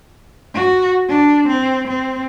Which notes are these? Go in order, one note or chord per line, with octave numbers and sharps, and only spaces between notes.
F#4
D4
C4
C4